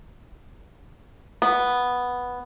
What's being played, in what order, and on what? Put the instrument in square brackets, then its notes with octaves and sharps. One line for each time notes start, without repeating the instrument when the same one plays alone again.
[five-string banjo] B3